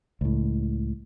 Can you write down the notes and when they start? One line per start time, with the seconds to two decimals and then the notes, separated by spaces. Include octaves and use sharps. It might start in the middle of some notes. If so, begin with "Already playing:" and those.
0.21 C#2 A2